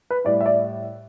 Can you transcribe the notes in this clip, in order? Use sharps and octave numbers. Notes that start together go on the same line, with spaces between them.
B4
A2 G3 D5
E5
D5